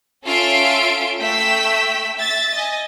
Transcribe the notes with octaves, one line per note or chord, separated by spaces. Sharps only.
C#4 F4 A4 E5 C6 D7
A3 G5 E6 B6
E5 A6
D#5 G#5